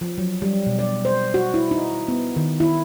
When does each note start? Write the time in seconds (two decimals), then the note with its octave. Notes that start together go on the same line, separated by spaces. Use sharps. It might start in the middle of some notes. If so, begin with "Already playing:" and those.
0.01 F3
0.18 F#3
0.42 G3
0.66 B2
0.79 D5
1.05 C5
1.34 F#4
1.54 E4
1.71 D#4
2.08 B3
2.36 D#3
2.60 E4